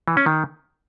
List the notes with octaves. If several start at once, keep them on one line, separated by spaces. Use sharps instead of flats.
E3
C#4
D#3